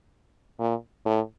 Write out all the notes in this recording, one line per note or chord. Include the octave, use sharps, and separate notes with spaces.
A#2
A2